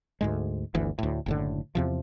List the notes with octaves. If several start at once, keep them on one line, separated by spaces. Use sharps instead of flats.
D2 G#2 G#3
G1 D2 E3
D2 A2
F#1 A2 D3
E2 C3 F3